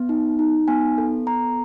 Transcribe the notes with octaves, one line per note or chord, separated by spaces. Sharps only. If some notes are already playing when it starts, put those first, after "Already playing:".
Already playing: B3
D#4
D#4
B3 G#5
A4
B3 A#5